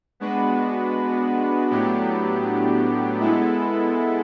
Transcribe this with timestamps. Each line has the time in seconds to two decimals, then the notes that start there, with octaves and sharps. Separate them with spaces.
0.20 G#3 B3 D4 F#4 B4
1.70 A2 F#3 B3 D4 G4
3.20 G#3 B3 E4 A4